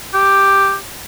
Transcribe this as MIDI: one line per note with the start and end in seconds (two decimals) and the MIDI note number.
0.14 0.75 67